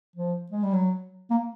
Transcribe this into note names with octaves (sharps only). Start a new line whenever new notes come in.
F3
G#3
G3
F#3
A#3